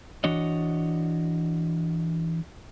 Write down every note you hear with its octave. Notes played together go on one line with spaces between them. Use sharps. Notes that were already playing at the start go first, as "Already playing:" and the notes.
E3 D4 F#4 C#5 D#5